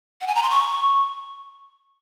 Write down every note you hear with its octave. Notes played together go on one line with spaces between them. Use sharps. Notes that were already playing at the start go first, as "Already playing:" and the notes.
F#5
G#5
A#5
C6
C#6